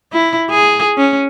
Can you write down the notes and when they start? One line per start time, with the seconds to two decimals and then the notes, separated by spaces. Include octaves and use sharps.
0.13 E4
0.50 G#4
0.97 C#4